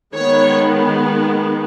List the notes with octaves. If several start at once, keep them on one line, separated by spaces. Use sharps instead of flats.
D#3 G#3 B3 C#5